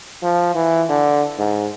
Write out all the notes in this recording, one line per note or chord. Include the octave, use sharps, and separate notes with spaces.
F3
E3
D3
G#2